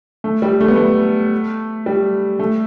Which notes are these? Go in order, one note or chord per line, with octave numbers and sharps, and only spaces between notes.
A3
G3
A3
B3
A3
G3
A3